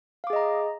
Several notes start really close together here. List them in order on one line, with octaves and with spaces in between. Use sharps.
F5 D6 G#4 D#5 A#5